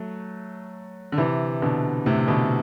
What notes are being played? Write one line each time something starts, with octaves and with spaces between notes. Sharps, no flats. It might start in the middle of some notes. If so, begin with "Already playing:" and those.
Already playing: F#3 A3
D3
C3 E3
B2 D3
A2 C3
B2 D3